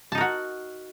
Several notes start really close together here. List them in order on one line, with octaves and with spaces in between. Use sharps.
A5 D#4 A#4 F#4